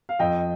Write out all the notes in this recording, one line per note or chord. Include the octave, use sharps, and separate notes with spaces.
F5
F2 D#5 G5